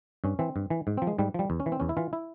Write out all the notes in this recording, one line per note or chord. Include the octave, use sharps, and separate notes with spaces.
G2 C#4
E3 C4
G2
E3
G#2
C4
F3
G#3
G#2 G3
F3 G3
E2
C#4
E3
C4
E2 C#4
E4
E3 F4
E4